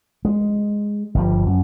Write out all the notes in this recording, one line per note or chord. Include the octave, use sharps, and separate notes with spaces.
G#3
G1 G2 F3
F#2